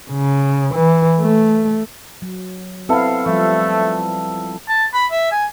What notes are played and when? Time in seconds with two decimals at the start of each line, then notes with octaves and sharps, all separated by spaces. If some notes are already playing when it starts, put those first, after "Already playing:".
0.11 C#3
0.75 E3
1.21 A3
2.22 F#3
2.89 B3 C4 E4 A4 F5
3.26 F3 G3 A3
4.68 A5
4.94 B5
5.11 E5
5.32 G#5